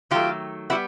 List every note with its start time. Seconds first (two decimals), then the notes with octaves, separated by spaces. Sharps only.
0.11 D#3 F#3 A3 F4 G4
0.70 G3 B3 E4 F#4